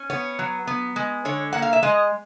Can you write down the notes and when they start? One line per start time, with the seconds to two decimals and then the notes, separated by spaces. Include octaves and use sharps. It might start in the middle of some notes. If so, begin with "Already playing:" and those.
Already playing: C#4
0.10 B3 C#5
0.39 F#3
0.67 B3
0.96 G#3
1.25 D3 C#5
1.53 A#3 F#5
1.62 F5
1.73 E5
1.83 G#3 D#5